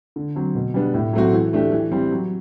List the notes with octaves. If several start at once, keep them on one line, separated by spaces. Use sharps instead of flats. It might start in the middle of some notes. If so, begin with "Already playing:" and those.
D3
F#3 C4
B2
G3 B3 D4
A2
F#3 A3 C4 F#4
E3
A3 D4 G4
E3
G3 C4 G4
F#3